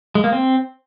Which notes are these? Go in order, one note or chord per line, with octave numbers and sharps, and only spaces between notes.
G#3
A#3
C4